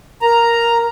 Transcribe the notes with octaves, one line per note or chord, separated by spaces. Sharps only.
A#4 A#5